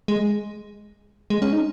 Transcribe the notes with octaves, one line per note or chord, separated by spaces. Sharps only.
G#3
G#3
C#4
D#4